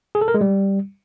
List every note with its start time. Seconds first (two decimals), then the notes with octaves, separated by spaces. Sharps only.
0.15 G#4
0.21 A4
0.28 A#4
0.34 G#3
0.41 G3